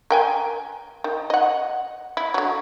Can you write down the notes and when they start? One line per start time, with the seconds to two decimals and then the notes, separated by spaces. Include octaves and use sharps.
0.10 A#4 G5 G#5
1.04 D#3
1.30 D#5 F#5
2.17 E4
2.34 D3 F#3